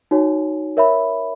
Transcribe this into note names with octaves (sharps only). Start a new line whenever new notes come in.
D#4 F#4 C#5 G#5
A#4 C#5 E5 B5